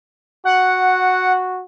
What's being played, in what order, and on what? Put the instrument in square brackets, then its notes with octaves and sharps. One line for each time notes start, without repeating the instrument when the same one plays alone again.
[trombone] F#4 [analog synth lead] F#5